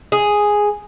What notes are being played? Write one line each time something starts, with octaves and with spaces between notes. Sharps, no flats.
G#4